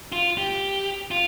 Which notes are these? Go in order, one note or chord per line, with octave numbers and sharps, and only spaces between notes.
F4
G4
F4